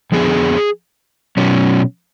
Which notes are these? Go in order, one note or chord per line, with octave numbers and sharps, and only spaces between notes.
F2 D3 F3 B3 G#4
B2 F#3 C#4